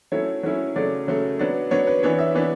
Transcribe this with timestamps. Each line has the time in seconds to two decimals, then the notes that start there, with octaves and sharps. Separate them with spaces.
0.12 F#3 A3 C#4 E4 C#5
0.43 F#3 A3 C#4 E4
0.75 C#3 F#3 A3 D5
1.07 C#3 F#3 A3
1.39 F#3 B3 D4
1.71 F#3 B3 D4 C#5
1.87 B4
2.03 E3 B3 D4 C#5
2.19 E5
2.35 E3 B3 D4